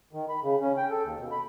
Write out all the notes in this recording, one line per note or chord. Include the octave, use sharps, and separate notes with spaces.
D#3
B5
C#3
C#4
G5
A4
D#2
B2
B5